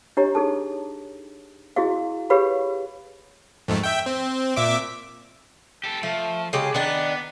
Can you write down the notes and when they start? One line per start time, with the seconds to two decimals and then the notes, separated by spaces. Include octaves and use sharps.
0.17 D4 G4 C#5 D#5 A#5
0.35 D#4 G#4 A4 A5
1.76 E4 F#4 G#4 D#5 F5
2.30 G4 G#4 B4 C#5 F5 B5
3.68 F2 G#2 A3
3.84 E5 G5
4.06 C4
4.56 A#2 E5 D6
5.84 G4 A4
6.03 F3 A3
6.53 C#3 G#3 G4
6.74 D#3 B3 D4